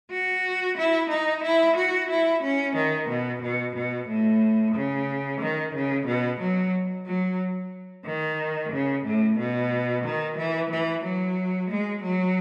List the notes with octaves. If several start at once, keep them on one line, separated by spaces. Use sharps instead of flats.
F#4
E4
D#4
E4
F#4
E4
C#4
D#3
B2
B2
B2
A2
C#3
D#3
C#3
B2
F#3
F#3
D#3
C#3
A2
B2
D#3
E3
E3
F#3
G#3
F#3